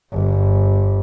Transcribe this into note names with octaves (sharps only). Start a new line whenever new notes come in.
G1